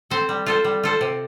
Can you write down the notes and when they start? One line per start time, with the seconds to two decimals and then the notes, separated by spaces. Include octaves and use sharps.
0.10 C4 A4 C5
0.29 G3
0.46 F4 A4 C5
0.64 G3
0.83 F4 A4 C5
1.01 C3